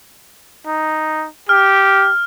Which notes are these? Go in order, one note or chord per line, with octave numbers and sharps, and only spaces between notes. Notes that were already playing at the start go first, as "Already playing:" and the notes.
D#4
G4 F6